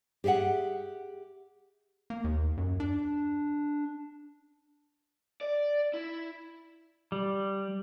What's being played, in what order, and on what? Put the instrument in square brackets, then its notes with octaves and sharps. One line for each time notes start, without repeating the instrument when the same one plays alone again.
[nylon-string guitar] G4 G#4 D#5 E5 F#5
[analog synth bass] A#3
D#2
F#2
D4
[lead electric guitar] D5
E4
[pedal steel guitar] G3